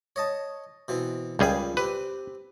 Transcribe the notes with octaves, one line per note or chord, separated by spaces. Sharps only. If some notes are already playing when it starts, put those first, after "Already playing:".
C#5 D#5 A5
B2 E3 C4
C#2 A#2 G3 G#4 B4
C4 G4 B4